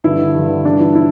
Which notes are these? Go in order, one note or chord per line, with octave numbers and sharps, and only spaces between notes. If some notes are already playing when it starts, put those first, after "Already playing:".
G2 D3 E4
G2 D3
G2 E3 D4
E4
E4